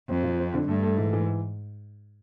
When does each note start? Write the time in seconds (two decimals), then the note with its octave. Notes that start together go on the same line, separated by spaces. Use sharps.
0.09 F2 C4
0.23 F3
0.39 C4
0.54 D3
0.68 G2 A3
0.83 A3
0.98 G#2 E3
1.13 E3